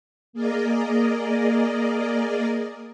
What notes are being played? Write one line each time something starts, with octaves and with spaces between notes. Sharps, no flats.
A#3 G#4 A#4 D5 D#5